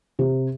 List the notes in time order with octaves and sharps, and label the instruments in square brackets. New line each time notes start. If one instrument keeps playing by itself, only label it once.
[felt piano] C3